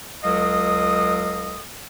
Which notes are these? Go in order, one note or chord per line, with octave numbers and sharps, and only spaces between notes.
C#2 F#3 A4 D#5 F5 D#6